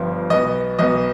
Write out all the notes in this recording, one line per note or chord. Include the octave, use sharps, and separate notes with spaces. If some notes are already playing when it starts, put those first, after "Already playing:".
Already playing: G1 G2 F3 B3
B1 B2 B3 D#5
B1 B2 B3 D#5